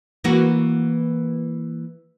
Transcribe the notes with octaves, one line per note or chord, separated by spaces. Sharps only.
E3 A#3 F#4